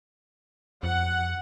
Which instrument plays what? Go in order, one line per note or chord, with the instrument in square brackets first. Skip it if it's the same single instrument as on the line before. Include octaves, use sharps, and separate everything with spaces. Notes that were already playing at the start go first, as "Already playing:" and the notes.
[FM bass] F2 [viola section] F#5